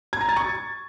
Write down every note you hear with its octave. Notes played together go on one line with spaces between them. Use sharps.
G#6
A#5
A6
C#6